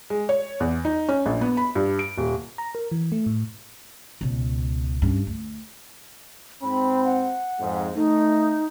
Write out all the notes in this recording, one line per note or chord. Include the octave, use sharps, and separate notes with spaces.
G#3
C#5
E2
D#4
C#4
A#1
B3
B5
G2
D7
D#1
A#5
A#4
E3
A3
A2
C#2 B2
G2 C#4
D2
G#2 C4 B5
F#5
F2 G#2
A3 D#4